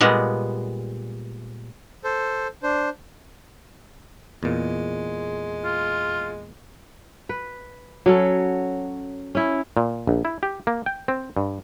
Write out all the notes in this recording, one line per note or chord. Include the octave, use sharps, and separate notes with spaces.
A#2 G3 G#3 B3
A4 C5
D4 C5
E2 A#2 G#3
F4
B4
F#3 C#4 A4
C#4 E4
A#2
A#1
E4
G4
A#3
G5
C4
G2